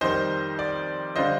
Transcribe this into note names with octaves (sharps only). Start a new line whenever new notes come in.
F2 D#3 G3 C5 D#5
D5
D3 G3 D4 F4 C5 D#5